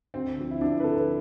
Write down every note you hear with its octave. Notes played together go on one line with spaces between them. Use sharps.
D2 C4
D3 F3
E4
D2 D4
E4
B4
D3 F3 A4
B4